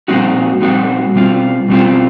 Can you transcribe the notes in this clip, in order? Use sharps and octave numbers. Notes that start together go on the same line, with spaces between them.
A#2 G3 C4 D#4 F#4
A#2 G3 C4 D#4 F#4
B2 G3 C4 F4
B2 G3 C4 F4